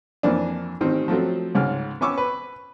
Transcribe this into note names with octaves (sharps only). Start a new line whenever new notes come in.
F2 E3 A#3 C4 D4
A1 D#3 C4
F3 F#3 A3 C4
C#2 G#2 F6
B3 C#4 C#6 D6 E6
B4